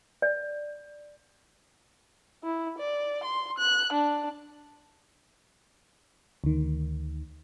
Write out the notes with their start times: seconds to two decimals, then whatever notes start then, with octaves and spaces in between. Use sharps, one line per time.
0.22 D5
2.43 E4
2.78 D5
3.23 C6
3.58 F#6
3.92 D4
6.44 D2 D#3